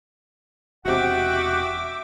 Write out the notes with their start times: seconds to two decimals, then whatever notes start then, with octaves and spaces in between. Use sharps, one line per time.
0.85 E1 C3 F#4 D#5 E5 F#5 G5 D6